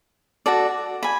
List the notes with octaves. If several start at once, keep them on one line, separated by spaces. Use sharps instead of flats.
F#4 A4 D5
G#5 B5